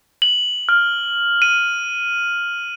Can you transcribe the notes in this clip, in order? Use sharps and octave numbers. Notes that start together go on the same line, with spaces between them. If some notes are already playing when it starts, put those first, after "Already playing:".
F#7
F6
D#7